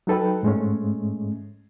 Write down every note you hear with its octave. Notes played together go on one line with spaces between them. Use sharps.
F#3 D#4 A4 B4 G5
G#2 G#3 A3 C#4